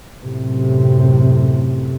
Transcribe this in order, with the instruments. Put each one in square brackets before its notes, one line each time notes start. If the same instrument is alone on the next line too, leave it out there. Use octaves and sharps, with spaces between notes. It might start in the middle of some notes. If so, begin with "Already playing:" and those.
[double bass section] F#2 A2 C3